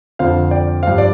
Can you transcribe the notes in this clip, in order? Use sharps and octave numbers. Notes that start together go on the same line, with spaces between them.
F2 D3 F3 C5 F5
D5 G5
G2 F3 C5 F5
D5